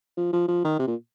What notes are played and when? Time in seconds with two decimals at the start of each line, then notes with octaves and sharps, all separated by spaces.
0.17 F3
0.33 F3
0.48 F3
0.64 D#3
0.79 C3
0.87 A#2